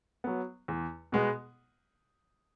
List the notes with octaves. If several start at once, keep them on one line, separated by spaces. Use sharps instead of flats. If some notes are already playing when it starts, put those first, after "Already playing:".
F#3 B3
E2
B2 G#3 B3